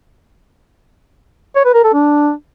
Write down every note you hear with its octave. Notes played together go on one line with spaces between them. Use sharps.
C#5
B4
A#4
A4
D4